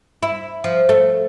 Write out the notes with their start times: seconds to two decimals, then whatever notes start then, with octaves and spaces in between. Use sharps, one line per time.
0.23 E4
0.64 F3
0.89 A3